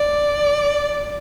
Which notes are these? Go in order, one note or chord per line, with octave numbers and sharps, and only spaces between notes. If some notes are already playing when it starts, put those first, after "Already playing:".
Already playing: D5